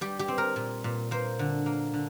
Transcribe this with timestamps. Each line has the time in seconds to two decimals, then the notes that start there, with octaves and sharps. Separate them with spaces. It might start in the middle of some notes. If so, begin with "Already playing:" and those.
0.01 G3 G4
0.19 G4
0.28 C4
0.38 A#4
0.56 A#2
0.84 A#2
1.11 A#3 C5
1.39 D3
1.66 A#3
1.94 D3